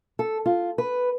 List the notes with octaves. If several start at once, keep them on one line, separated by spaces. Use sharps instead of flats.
A4
F4
B4